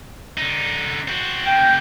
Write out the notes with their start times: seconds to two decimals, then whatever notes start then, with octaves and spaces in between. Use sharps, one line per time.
0.38 D3 D#4
1.08 C4 F#4
1.45 C#3 A#3 G5